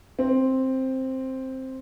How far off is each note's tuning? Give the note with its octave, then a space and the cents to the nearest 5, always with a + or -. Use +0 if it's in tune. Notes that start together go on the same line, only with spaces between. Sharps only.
C4 +5